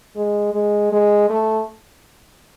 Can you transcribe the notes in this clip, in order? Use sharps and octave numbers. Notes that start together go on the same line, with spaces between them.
G#3
G#3
G#3
A3